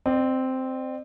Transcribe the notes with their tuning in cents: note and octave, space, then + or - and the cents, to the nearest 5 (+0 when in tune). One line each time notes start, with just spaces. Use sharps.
C4 -5 D5 +45